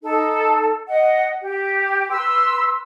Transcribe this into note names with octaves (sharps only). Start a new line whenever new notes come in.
D#4 A4
D#5 F#5
G4
B4 C6 E6